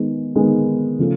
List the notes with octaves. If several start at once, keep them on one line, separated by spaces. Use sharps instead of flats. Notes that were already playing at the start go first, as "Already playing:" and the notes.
Already playing: D#3 G#3 B3 D#4 G#4
D#3 G#3 B3 D#4 G#4
C#3 F3 A3